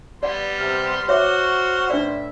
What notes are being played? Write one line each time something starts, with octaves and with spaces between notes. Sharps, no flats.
G3 B3 D5 F#5 C6
C3 F6
F#4 C5 C#5 E5 D6
A2 D4 B4 D5 E5